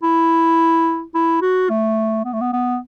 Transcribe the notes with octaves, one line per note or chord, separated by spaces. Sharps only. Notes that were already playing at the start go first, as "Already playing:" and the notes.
E4
E4
F#4
A3
B3
A3
B3
B3